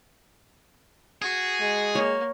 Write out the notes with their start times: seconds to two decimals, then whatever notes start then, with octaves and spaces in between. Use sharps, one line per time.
1.22 F#4 G#4
1.60 G#3
1.95 A#3 C#5